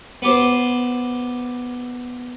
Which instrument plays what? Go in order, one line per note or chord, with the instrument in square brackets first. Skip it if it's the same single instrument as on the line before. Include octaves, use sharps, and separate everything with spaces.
[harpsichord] B3 G4 C5